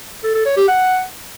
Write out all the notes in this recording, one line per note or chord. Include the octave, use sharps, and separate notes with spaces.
A4
A4
C#5
G4
F#5